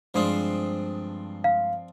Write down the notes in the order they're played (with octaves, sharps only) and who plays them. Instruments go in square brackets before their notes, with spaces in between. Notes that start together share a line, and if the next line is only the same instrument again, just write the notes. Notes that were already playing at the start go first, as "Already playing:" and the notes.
[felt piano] G2 G#3 D#6 [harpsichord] F3 C4 D4
[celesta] F5